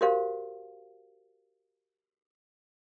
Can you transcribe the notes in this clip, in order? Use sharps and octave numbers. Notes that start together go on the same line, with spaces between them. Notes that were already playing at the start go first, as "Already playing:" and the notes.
F#4 G4 A#4 C5 F5